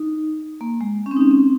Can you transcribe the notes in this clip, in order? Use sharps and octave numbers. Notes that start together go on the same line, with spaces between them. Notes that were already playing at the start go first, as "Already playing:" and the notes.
Already playing: D#4
A#3
G#3
C#4
C4
D#4
C#4
C4